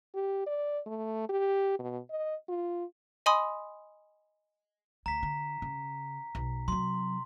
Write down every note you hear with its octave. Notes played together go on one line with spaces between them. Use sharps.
G4
D5
A3
G4
B2
D#5
F4
D#5 G#5 B5 C6 D#6
D2 A#5 B6
D3
C#3
B1
C3 F#3 C6